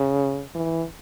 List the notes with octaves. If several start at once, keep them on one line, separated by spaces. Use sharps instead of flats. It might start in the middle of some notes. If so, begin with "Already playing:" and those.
Already playing: C#3
E3